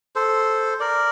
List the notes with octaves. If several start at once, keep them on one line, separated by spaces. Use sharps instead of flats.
A4 C5
A#4 D5